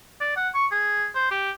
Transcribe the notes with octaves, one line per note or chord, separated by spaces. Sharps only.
D5
F#5
C#6
G#4
C5
G4